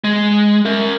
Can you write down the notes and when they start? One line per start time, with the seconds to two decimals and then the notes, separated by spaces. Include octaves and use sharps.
0.04 G#3
0.65 A#4 E5